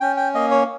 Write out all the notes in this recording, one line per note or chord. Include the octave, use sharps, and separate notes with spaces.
C#4 G5
G5
A#3 D#5
C#5